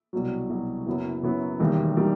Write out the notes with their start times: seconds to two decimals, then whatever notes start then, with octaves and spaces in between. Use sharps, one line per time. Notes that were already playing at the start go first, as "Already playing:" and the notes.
0.13 C2 B2 F#3
0.50 C2 B2 F#3
0.87 F#1 F#2 F#3 B3 E4
1.23 F#1 F#2 F#3 B3 E4
1.60 E1 D#2 D#3 G3
1.97 D#3 G3